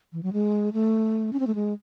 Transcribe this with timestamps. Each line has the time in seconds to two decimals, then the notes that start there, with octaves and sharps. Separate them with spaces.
0.13 E3
0.23 F#3
0.33 G#3
0.73 A3
1.33 C#4
1.40 C4
1.47 A3
1.55 G#3